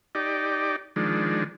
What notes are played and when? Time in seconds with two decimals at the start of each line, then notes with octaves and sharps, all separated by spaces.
0.15 D#4 G4 D5
0.96 D#3 F3 G#3 D4